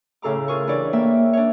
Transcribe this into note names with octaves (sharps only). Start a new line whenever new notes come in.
A2 C#3 A4 A#5 D6
F4 G#4 A#4 C#6
E3 D4 C#5 D5
A#3 E5 G5
D4 C#5